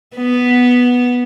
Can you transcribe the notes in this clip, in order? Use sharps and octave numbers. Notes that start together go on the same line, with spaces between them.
B3